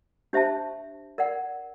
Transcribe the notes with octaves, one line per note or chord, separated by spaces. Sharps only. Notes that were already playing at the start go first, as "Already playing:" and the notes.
D4 G4 C5 E5 A5
A#4 D5 F#5